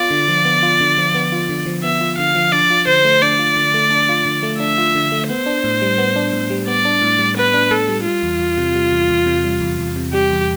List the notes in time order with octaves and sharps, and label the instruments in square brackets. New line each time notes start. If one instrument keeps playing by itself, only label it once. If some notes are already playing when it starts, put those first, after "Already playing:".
Already playing: [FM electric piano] B3 F4 [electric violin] D5
[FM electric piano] D3
F3
B3
F4
D3
F3
B3
F4
D3
F3
[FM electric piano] B3 [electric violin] E5
[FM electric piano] F4
[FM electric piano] D3 [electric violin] F5
[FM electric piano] F3
[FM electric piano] D4 [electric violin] D5
[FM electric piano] F4
[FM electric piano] D3 [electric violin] C5
[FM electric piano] A3
[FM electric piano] D4 [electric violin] D5
[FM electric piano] F4
D3
A3
D4
F4
D3
A3
[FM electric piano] D4 [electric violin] E5
[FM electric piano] F4
D3
A3
[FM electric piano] B3 [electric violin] C5
[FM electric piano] D4
A2
G3
B3
D4
A2
G3
[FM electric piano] B3 [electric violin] D5
[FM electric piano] D4
A2
G3
[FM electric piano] B3 [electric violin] B4
[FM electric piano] D4
[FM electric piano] A2 [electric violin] A4
[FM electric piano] G3
[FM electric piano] G3 [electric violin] F4
[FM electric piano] E2
E2
C3
G3
E2
E2
C3
G3
E2
E2
C3
[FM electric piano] G3 [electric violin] G4
[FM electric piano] E2